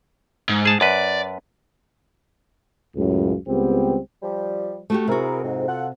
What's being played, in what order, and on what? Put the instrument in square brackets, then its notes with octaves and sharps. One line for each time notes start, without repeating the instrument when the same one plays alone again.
[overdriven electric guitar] G#2
[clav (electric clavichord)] G#4 A5
[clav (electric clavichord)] F#2 B4 [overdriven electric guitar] D5
[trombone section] C#2 F#2 A2 C#3
C#2 G3 B3 C4 G4
[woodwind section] F3 G3
[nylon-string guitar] A3 F#4 G4
[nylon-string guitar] C3 F#4 [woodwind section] E4 G#4 A#4
[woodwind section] F2 G#2
F4 A4 F#5